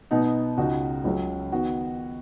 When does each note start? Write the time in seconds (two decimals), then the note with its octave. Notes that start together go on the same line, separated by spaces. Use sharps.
0.11 B2 B3 D#4
0.58 C#2 C#3 G#3 D#4 F#4
1.04 C#2 C#3 F#3 C#4
1.52 D#3 B3 F#4